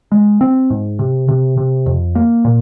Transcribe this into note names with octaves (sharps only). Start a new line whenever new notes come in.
G#3
C4
G#2
C3
C3
C3
F2
A#3
A#2